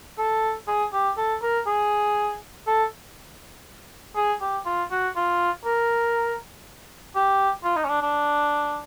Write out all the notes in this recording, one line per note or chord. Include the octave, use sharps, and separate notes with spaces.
A4
G#4
G4
A4
A#4
G#4
A4
G#4
G4
F4
F#4
F4
A#4
G4
F4
D#4
C#4
D4
D4